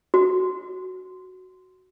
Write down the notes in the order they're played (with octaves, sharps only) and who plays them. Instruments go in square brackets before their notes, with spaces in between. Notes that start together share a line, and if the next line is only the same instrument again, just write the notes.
[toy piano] F#4